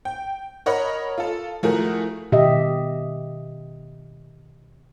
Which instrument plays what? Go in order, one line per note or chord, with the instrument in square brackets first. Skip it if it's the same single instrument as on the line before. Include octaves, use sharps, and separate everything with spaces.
[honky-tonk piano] G5
A#4 C#5 D#5 F#5 B5
F4 A4
F3 A3 E4 F#4 G#4 A#4
[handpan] B2 D#3 G4 D#5 E5